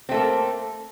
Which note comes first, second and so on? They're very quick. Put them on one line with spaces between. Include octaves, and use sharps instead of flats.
C4 A3 A4 A#3